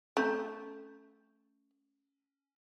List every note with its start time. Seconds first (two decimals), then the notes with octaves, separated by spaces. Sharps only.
0.17 A3 C#4 A#5 C#6